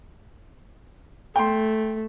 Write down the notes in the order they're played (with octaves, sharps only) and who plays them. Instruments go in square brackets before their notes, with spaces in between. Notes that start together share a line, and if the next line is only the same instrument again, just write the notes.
[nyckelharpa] A3 [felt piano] G5 C6